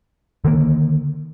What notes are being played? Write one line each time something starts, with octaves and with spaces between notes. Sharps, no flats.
D3 D#3 A#3